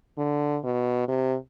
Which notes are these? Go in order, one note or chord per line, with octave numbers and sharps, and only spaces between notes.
D3
B2
C3